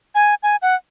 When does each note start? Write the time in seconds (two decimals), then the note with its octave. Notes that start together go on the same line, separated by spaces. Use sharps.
0.15 G#5
0.43 G#5
0.62 F#5